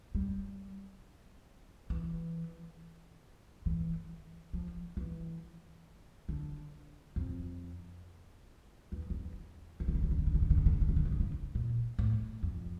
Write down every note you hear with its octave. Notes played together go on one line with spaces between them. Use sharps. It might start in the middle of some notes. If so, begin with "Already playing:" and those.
G3
E3
E3
F3
E3
D3
F2
E2
E2
C#3
D3
C#3
D3
C#3
D3
C#3
D3
C#3
D3
C#3
D3
C#3
D3
C#3
D3
C#3
D3
C#3
A#2
A2
F2